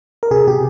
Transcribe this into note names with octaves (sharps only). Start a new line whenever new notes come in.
A#4
C3 G#4
C3 G4